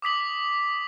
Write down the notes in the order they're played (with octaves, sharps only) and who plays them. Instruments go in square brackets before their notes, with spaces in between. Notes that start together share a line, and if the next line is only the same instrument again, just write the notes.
[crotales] D6 D#6 B6 F#7